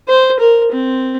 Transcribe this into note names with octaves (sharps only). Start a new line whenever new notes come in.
C5
A#4
C4